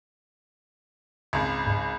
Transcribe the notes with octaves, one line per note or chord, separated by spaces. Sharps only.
G#1 C#2
G#2